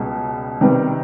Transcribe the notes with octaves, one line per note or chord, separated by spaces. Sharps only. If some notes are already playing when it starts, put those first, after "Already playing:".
Already playing: C#2 B2 G3
C3 D#3 G3 B3